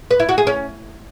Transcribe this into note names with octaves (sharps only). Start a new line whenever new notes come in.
B4
E4
F#4
G#4
C#4